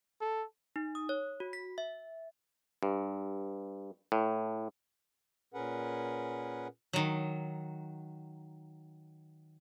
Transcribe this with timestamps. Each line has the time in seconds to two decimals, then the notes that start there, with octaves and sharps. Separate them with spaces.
0.21 A4
0.76 D#4
0.95 D#6
1.09 C#5
1.40 F#4
1.53 B6
1.78 E5
2.83 G2
4.12 A2
5.54 A#2 C#4 G#4 A#4 B4 F#5
6.93 D#3 F#3